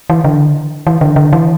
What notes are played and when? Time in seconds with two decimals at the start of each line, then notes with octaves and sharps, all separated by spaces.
0.10 E3
0.24 D3
0.87 E3
1.01 D3
1.16 D3
1.33 E3